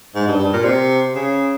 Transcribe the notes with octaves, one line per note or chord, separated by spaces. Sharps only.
G#2
G2
G2
A#2
C3
C#3